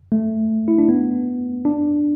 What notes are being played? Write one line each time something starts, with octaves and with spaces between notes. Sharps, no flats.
A3
E4
D4
B3
D4